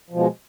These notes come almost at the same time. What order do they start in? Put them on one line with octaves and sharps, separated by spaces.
F3 B2 G#3